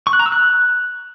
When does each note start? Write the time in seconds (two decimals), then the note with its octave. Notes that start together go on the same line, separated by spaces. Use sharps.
0.07 C#6
0.13 F#6
0.19 A#5
0.26 E6
0.32 F#6